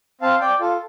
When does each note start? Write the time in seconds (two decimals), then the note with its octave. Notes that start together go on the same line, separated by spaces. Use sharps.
0.21 C4 F5 A5
0.40 D5 G5
0.60 F4 A4